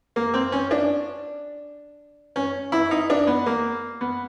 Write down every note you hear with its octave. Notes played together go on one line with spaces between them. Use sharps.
A#3
C4
C#4
D4
C#4
E4
D#4
D4
B3
A#3
B3